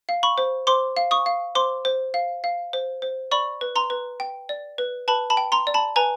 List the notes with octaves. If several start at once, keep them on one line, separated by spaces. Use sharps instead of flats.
F5
B5 C#6
C5
C5 C6 D6
F5
C#6 D#6
F5
C5 C6 D6
C5
F5
F5
C5
C5
D5 B5 C#6
B4
A#5 C6
B4
G5
D5
B4
B4 A5 B5
A5 B5
G5
A#5 C6
D5
A5 B5
B4 G#5 A#5